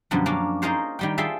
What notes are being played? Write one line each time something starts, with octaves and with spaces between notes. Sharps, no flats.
F#2 B2 D3 F3 G3
A#3 C#4 D4
D#4 F4 G#4 A#4 C5 C#5
D#3 G3 G5
F4 G#4 A4 C5 E5 G5